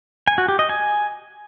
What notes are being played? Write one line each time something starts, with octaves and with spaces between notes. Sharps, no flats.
G#5
F#4
G4
D#5
G#5